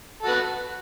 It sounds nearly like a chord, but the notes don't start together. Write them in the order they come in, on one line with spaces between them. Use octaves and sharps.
A4 F#4 B4